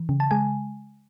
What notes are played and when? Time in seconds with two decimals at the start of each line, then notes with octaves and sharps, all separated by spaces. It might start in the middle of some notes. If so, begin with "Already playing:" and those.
Already playing: E3
0.09 C#3
0.20 A5
0.31 G#3 G#5